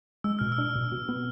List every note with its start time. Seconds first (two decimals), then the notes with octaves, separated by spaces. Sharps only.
0.24 G#3 E6
0.39 B2 F6
0.52 E6
0.58 D4
0.75 B2
0.92 B2
1.09 B3